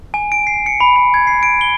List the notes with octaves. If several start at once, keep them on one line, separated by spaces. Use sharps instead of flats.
G#5
D7
C7
C#7
B5
B5
G#6
C7
D7
G7